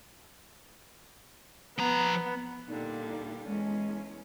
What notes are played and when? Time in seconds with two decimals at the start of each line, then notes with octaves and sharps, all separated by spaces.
1.78 F3 B3 A#5
2.67 A#2 D3 G3 D#4
3.46 E2 G#3 C#4